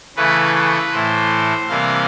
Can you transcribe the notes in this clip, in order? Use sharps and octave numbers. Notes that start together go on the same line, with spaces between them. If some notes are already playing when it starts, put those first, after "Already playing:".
C#3 E3 A3 B4
B4
A2 E3 A3 C5
C3 E3 G3 A#3 F5